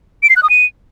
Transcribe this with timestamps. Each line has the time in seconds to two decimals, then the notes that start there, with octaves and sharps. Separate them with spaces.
0.23 D7
0.30 C7
0.36 F#6
0.43 D#6
0.50 D#7